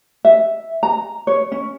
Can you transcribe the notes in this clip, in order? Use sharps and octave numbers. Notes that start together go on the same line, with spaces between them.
E5
A#5
C#5
C#4